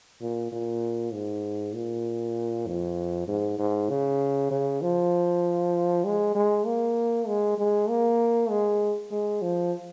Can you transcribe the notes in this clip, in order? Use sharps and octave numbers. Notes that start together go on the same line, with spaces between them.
A#2
A#2
G#2
A#2
F2
G#2
G#2
C#3
C#3
F3
G#3
G#3
A#3
G#3
G#3
A#3
G#3
G#3
F3